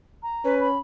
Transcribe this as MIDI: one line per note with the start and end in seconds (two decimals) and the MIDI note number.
0.23 0.55 82
0.45 0.77 61
0.45 0.68 71
0.60 0.79 83